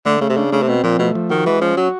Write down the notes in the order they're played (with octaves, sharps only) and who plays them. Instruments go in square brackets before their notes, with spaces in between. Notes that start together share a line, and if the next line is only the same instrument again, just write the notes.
[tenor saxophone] D3 [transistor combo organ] A3
[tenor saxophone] C#3 [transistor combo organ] A3
[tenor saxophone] C3
[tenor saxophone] C#3 [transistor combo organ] D4
[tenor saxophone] C#3 [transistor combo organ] A3
[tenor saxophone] C3
[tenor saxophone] B2 [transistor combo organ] C4
[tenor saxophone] A#2 [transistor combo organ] F3
[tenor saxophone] B2 [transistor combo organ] A3
[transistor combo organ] F3
[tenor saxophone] D#3 [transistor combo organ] F#4
[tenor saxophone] E3 [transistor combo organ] G#3
[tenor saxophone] F3 [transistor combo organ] C#4
[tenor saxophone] F#3 [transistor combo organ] F#4